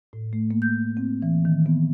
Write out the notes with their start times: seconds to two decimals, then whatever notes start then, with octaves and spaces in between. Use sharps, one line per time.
0.13 A2
0.33 A3
0.51 A#3
0.62 G6
0.97 C4
1.22 E3
1.45 D#3
1.66 B3